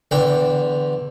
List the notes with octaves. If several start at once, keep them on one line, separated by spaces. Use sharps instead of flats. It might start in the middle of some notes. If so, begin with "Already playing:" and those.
E2 D3 G5